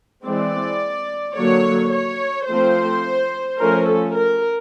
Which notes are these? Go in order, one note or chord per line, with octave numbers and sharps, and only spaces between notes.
E3 G#3 C4 D5
D3 F#3 A#3 C#5
C#5
F3 A3 C4 C5
F3 A3 C#4 A#4
A4
A#4